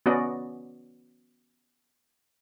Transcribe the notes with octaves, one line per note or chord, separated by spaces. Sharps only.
B3 C#4 F#4 D5 D#5